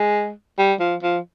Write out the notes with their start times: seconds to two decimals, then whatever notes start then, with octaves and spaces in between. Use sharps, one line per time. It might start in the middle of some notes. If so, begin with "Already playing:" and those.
Already playing: G#3
0.58 G3
0.80 F3
1.03 F3